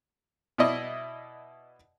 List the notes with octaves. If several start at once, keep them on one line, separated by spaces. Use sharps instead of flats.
B2 E4 D5 D#5